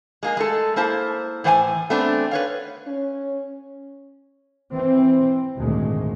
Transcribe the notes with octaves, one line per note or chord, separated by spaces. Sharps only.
G#3 A#3 G#4
G#3 A3 A4
A#3 E4 C5 A5
A2 E3 C5 F#5 G#5
A3 B3 C4 D4
B4 C#5 F5
C#4
E3 C4
G#1 D2 A#2 G#3